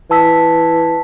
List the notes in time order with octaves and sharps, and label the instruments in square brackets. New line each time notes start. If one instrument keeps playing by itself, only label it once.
[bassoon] E3 [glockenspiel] A5 E6 B6